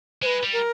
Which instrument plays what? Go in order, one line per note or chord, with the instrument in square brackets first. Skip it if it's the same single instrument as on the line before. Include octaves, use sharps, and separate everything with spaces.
[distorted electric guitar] G#3 [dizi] C5
[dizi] B4
[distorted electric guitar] G3
[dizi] A#4